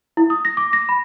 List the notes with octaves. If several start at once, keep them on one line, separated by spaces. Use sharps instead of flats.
E4
D#6
A#6
D6
A#6
B5